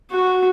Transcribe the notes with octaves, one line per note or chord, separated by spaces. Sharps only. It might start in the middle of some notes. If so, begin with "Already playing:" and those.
F#4